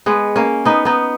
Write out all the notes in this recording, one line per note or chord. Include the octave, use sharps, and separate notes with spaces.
G#3 B3
A#3 C#4
B3 D#4
B3 D#4